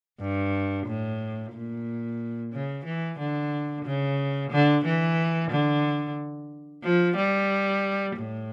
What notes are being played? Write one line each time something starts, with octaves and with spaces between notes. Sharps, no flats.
G2
A2
A#2
C#3
E3
D3
C#3
D3
E3
D3
F3
G3
A2